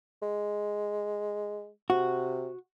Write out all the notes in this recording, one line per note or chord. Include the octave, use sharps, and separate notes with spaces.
G#3
C3 F#4